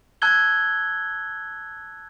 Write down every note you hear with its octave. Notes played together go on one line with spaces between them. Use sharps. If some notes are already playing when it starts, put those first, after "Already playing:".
A5 E6 F#6 G#6 G7